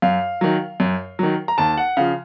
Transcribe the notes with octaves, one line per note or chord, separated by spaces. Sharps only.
F#2 F5
D#3 F#3
F#2
D#3 F#3
A#5
D#2 A5
F#5
C#3 F3 F5